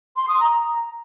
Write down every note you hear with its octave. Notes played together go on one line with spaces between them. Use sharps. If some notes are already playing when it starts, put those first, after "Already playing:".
C6
D#6
A#5